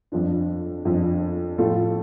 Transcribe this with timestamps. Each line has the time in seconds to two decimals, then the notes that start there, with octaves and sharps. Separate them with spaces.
0.12 F2 F3 D4
0.85 F2 F3 D4
1.58 A2 F3 A3 F4 A4